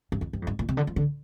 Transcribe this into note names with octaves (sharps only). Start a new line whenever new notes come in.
G2
F2
G2
F2
G2
A#2
C3
D3
F3
D3